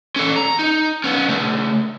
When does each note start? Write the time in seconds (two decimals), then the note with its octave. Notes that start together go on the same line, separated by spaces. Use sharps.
0.16 C#4 A4
0.36 A#5
0.59 D#4
1.04 B3 C#4
1.28 C#3 A3